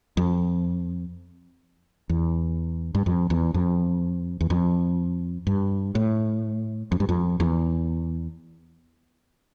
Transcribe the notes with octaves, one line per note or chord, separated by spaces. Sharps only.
F2
E2
G2
F2
E2
F2
E2
F2
G2
A2
F2
G2
F2
E2